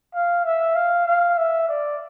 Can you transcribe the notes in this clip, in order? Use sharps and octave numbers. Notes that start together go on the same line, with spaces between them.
F5
E5
F5
F5
E5
D5